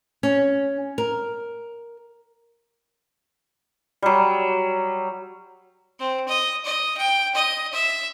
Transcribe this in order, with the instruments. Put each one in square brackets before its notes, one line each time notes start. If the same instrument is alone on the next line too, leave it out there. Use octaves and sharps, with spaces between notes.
[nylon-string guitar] C#4
A#4
[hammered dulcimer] F#3 G3
[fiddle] C4
D#5
D#5
G5
D#5
E5